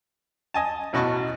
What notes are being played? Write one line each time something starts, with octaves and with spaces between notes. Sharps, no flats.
D#5 G#5 A5
A1 B2 F#4 D#5 A5 C#6